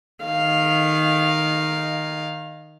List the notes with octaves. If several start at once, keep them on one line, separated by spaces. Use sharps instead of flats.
D#3 F5